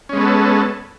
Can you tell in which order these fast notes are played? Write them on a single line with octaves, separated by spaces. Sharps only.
C#4 G#3 B3 A4